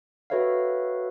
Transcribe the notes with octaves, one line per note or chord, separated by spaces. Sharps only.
F#4 A4 B4 C#5 E5 F5